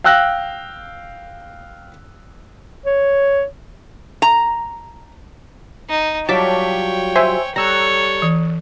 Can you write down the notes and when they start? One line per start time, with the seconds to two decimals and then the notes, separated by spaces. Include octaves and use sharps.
0.04 F5 G5 E6 F#6 A#6
2.86 C#5
4.22 A#5
5.90 D#4
6.29 F#3 G3 F4 C#5 G5 A5 D6 B6
7.15 C5 E5 G#5
7.56 G3 A4 C#5 A#5 E6 F#6
8.22 E3